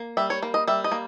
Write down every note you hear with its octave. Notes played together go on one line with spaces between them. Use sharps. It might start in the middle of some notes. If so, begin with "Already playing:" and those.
Already playing: A#3
G3 E5
C#5
A#3
D#5
G3 E5
D#5
A#3